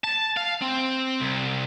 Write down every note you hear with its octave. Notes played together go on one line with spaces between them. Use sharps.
A5
F5
C4
C2